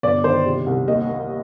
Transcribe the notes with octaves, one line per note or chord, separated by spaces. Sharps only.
G1 D5
D#3 C5
C3
C2
D#2 D#5
A#3